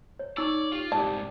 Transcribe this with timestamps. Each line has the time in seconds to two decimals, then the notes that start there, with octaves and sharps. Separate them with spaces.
0.19 C#5
0.37 D#4 C#5 D5 E6
0.72 F4 G4
0.92 C2 G#2 G4 D5 A5